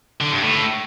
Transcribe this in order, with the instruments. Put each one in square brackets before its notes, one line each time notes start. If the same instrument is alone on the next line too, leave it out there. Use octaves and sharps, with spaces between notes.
[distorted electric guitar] D3
G2
A2